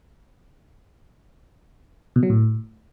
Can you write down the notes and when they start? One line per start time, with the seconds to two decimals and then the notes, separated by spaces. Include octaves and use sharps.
2.16 B2
2.23 F#3
2.30 A2